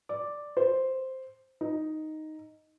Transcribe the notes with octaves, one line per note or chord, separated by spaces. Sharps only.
D5
C5
D#4